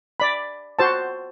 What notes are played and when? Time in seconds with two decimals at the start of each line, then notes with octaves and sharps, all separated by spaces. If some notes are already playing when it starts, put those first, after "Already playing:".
0.20 D5 B5
0.79 F#4 C5 A5